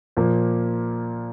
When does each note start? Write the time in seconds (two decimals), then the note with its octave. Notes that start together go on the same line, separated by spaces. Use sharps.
0.17 A#2 F3 A#3